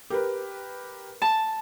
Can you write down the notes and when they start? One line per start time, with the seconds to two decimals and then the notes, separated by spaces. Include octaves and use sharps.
0.10 G4 A#4 B4
1.22 A5